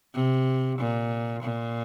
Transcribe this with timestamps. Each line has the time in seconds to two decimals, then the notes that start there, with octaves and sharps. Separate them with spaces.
0.15 C3
0.79 A#2
1.43 A#2